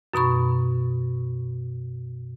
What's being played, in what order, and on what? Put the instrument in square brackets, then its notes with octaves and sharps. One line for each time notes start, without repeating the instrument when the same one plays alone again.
[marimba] F#2 B2 B5 C#6